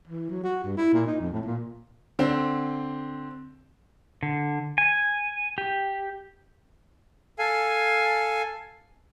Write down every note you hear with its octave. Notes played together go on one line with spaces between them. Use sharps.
E3
F#3
F#4
G2
E4
A#2
D#4
F2
A2
A#2
D3 C4
D3
G#5
G4
A4 F5 G#5